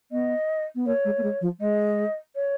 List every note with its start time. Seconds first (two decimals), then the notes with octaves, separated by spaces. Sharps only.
0.11 B3 D#5
0.75 B3
0.86 A#3 C#5
1.05 G#3
1.18 A#3
1.23 G#3
1.41 F3
1.60 G#3 D#5
2.35 C#5